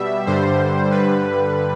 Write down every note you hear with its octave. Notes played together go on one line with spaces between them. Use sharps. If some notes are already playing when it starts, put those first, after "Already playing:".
Already playing: B2 G3 E5
G2 D3 G3 C5
G2 D3 G3 B4